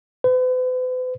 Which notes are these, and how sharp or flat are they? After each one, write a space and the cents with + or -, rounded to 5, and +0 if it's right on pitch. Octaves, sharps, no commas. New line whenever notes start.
B4 +45